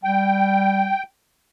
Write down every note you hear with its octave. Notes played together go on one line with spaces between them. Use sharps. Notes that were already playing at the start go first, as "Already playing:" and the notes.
G3 G5